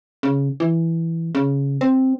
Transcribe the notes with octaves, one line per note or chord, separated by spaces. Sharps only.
C#3
E3
C#3
C4